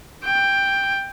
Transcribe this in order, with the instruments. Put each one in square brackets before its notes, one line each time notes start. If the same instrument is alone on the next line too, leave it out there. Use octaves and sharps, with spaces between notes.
[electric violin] G5